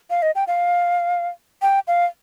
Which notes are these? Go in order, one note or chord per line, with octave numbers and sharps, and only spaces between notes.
F5
D#5
G5
F5
G5
F5